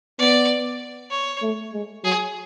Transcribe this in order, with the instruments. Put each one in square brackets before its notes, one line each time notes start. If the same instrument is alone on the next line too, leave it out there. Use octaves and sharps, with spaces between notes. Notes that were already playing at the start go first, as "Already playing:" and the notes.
[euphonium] B3 [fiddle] D5
[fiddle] C#5
[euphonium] A3
G#3
[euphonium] F#3 [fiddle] G#4